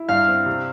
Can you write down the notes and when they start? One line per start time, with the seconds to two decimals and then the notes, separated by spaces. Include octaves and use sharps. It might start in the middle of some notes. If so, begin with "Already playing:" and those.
Already playing: E4
0.09 G2 F5
0.28 C4
0.46 C3